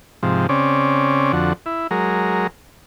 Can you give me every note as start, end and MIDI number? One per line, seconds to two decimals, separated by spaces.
0.23 0.47 44
0.23 0.47 48
0.23 0.47 53
0.49 1.32 49
0.49 1.32 60
0.49 1.32 61
0.49 1.32 74
1.33 1.53 41
1.33 1.53 50
1.33 1.53 66
1.66 1.87 64
1.91 2.47 54
1.91 2.47 56
1.91 2.47 70